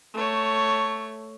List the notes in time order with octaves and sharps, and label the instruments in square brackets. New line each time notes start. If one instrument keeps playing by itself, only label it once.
[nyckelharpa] A3 C#5